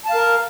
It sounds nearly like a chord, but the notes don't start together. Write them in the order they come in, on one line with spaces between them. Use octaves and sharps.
A5 F5 A#4